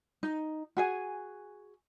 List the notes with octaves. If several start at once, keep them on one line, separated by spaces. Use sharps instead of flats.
D#4
F#4 G#4 G#5